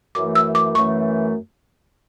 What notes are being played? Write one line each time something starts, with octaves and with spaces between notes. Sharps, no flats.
F#2 E3 A3 D6
E6
D6
F#2 E3 A3 C#6